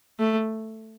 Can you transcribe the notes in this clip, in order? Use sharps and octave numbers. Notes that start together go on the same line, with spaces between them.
A3